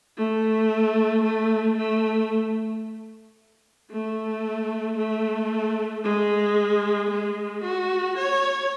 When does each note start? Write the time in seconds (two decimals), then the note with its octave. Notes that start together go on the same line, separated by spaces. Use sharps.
0.17 A3
1.24 A3
1.78 A3
3.90 A3
4.98 A3
6.04 G#3
7.10 G#3
7.64 F#4
8.18 C#5